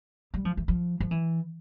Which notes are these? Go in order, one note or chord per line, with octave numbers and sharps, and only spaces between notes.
G3
F3
E3
F3
F3
E3